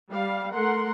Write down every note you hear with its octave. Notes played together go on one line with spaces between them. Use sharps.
G3 F5
A3 A#4 F#5 C6